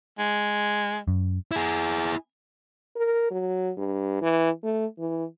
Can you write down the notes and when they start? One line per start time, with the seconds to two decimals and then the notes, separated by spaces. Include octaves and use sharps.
0.18 G#3
1.08 F#2
1.52 E4 G#4
2.96 A#4
3.31 F#3
3.77 G2
4.21 E3
4.63 A3
4.99 E3